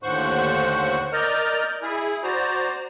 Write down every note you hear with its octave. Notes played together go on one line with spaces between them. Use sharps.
D#2 A2 D3 C5 F#5 C#6
A#4 D5 D#5 F6 G6
E4 G#4
F#4 C5 D5 A#5